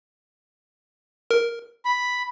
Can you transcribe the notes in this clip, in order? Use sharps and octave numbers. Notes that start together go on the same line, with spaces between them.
A#4
B5